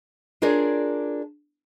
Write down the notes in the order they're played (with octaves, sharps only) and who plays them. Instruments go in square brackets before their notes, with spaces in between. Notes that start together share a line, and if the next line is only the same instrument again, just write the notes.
[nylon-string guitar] D4 F4 G#4 A#4 C#5 D5